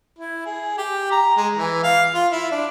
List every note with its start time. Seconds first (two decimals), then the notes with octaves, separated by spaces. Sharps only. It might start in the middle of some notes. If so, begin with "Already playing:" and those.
0.19 E4
0.46 G#4
0.78 G4
1.12 A#5
1.36 G#3
1.56 E3
1.84 F5
2.14 F4
2.32 E4
2.51 D4